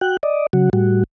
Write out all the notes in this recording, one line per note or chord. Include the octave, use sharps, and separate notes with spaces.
F#4 G5 F#6
D5 D#5
C#3 F#3 F#4
A2 G3 F#4